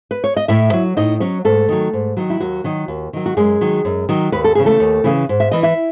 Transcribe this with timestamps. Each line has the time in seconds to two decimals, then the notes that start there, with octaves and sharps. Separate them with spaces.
0.11 B4
0.24 C#5
0.36 D#5
0.48 A2 E4 E5
0.73 F#3
0.97 A2 D#4 D#5
1.20 F#3 C#4 C#5
1.45 G#2 A3 A4
1.68 D#3 F#3
1.93 G#2
2.17 D#3 F#3
2.30 E4
2.40 D#2 F#3 F#4
2.64 D#3 F#3
2.88 D#2
3.13 D#3 F#3
3.26 F#4
3.37 F#2 G#3 G#4
3.61 D#3 F#3
3.85 F#2
4.09 D#3 F#3
4.32 D#2 B4
4.44 A4
4.55 C#3 E3 G#4
4.66 A3 A4
4.80 D#2
5.04 C#3 E3
5.29 G#2
5.40 E5
5.51 E3 D#5
5.63 E4 E5